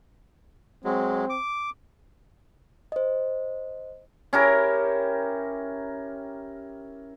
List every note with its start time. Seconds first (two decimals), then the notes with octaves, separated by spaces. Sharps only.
0.84 F#3 G#3 C4
1.29 D6
2.92 C5 D#5
4.33 C#4 E4 G4 A#4